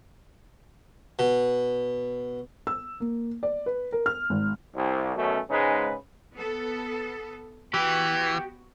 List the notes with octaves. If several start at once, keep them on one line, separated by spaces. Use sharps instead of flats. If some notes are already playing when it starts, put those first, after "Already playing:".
B2
E6
A#3
D5
B4
A#4
F6
G#1
C2
F#2 B2 A3 C#4
G#2 C#3 G#3 D#4 B4
B3 A4
E3 B3 F#4 G4